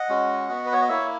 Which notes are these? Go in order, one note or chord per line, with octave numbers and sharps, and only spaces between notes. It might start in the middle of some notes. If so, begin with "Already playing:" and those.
Already playing: D#5 F#5
G#3 C#4 F#4
B3 F#4
B4
C#5
D#5
A#3 E4 C#5 E5